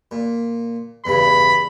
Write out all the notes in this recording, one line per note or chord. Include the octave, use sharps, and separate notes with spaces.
A#2
E2 G2 C#3 B5